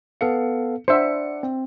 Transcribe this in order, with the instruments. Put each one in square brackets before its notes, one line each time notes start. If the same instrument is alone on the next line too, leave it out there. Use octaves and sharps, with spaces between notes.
[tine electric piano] B3 A4 F5 [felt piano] C#7
[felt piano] D4 F#5 [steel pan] C5 E5 [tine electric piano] C#7
[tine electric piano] C4